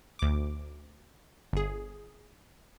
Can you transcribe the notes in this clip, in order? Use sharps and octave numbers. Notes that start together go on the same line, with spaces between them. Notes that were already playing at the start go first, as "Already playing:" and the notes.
D2 D6
G1 G#4